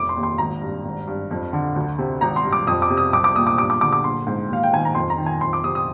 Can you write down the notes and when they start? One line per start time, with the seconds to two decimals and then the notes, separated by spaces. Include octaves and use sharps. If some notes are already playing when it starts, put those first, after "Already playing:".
Already playing: F1 D6
0.09 C6
0.16 D#2
0.23 C6
0.38 G#1 A#5
0.61 G2
0.85 G#1
1.07 G2
1.31 F2
1.53 D3
1.76 D2
1.98 C3
2.21 G#1 A#5
2.36 C6
2.44 G2
2.53 D6
2.67 F2 D#6
2.82 D6
2.90 C3
2.97 D#6
3.13 C2 D6
3.24 D6
3.36 A#2 D#6
3.47 D6
3.58 G2 D6
3.70 D6
3.81 D3 D6
3.93 D6
4.04 A#1 C6
4.27 G#2
4.49 D#2 F5
4.63 G5
4.73 D#3 G#5
4.85 A#5
4.95 F2 C6
5.10 A#5
5.18 D#3
5.26 G#5
5.41 F2 C6
5.53 D6
5.64 C3 D#6
5.75 D#6